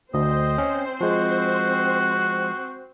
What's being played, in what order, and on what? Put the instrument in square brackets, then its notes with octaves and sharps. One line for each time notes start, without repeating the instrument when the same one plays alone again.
[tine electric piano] D2 [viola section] C4 C5 [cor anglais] D#5
[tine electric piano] C#4
[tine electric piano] F3 G#3 [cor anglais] F#4